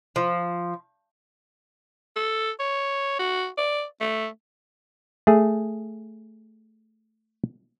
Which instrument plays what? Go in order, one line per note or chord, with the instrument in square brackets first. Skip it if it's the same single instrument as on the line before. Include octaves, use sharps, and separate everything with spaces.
[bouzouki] F3
[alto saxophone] A4
C#5
F#4
D5
A3
[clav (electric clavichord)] A3 G#4